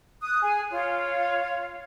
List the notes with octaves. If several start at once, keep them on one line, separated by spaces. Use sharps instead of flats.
D#6 F#6
G#4 G#5
F4 C#5 F5